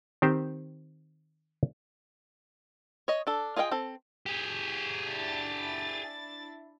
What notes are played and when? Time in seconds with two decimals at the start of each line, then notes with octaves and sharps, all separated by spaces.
0.22 D#3 C4 G4 C5
3.08 C#5 D#5
3.27 D4 A4
3.56 F4 G#4 D#5 F5 G5
3.71 C4 A4
4.26 G4 G#4
5.08 D4 E4 A6